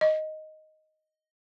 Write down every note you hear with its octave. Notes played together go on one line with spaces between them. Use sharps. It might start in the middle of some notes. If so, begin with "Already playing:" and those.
D#5